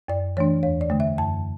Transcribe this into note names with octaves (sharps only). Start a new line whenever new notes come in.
F#2 D5
E3 A3 D4 C#5
E2 C#5
D5
D3 A3
E5
F#2 A5